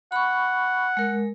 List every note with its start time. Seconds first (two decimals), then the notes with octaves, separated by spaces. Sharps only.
0.12 F#5 B5 C#6
0.97 G#3 A#4